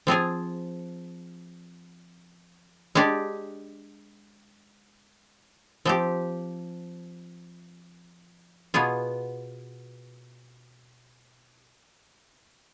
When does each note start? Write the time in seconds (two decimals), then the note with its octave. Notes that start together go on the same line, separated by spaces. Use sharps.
0.07 F3 C4 F4 G#4
2.95 G#3 D4 G4
5.85 F3 C4 G4
8.74 B2 B3 F4 G#4